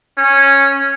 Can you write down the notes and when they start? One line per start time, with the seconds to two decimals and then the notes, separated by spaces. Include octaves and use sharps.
0.18 C#4